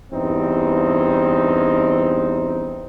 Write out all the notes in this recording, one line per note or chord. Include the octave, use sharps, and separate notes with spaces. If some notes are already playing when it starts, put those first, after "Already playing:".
E2 G2 C4 D#4